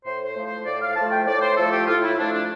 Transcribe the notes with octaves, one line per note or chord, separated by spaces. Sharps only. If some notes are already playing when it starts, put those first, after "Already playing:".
A2 C5
C5
F3 A3
C5
A2 D5
F5
F3 A3 A5
G5
A2 D5
C5
F3 A3 A4
G4
A2 F4
E4
F3 A3 D4
D4